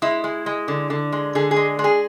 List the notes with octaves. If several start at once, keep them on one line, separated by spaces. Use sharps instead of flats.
G#3 E4
G#3
G#3
D3
D3
G#3
D3 G#4
G#4
G#3
G#3
G#4